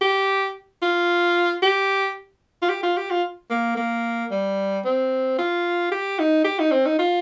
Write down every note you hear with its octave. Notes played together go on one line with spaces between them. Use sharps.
G4
F4
G4
F4
G4
F4
G4
F4
A#3
A#3
G3
C4
F4
G4
D#4
G4
D#4
C4
D#4
F4